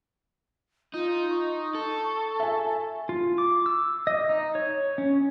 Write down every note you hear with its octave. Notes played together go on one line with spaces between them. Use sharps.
D#4 F4
C#6
A4
E5 G#5
F4
D6
E6
D#5
D#4
C#5
C#4